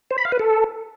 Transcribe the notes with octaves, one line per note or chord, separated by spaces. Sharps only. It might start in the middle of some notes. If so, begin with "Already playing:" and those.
C5
B5
F5
B4
A4